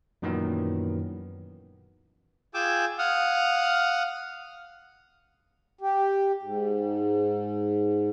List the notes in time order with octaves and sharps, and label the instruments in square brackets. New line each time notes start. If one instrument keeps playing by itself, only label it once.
[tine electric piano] F#2 A#2 D#3 E3 F#3 B3
[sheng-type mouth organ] F4 G#4 G5 G#5 D6 E6
F5 F#5 D#6 F6
[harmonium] G4
G#2